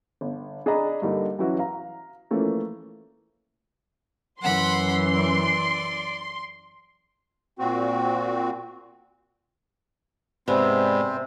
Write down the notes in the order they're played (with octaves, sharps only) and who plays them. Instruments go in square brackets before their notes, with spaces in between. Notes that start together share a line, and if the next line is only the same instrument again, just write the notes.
[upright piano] G1
D4 G#4 D5 D#5 A#5 B5
G2 D3 G3 A#3 D#4 G4
E3 F#3 C#4 E4 F#4
F5 A#5
E3 F3 A3 A#3 C#4
[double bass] F#2 E3 [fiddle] F#5 B5 [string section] C6
[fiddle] D5
[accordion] A#2 C4 F#4
[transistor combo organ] G#2 [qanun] C3 B3 [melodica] C4 [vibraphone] D5 G#5 B5